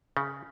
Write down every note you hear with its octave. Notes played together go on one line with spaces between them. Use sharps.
C#3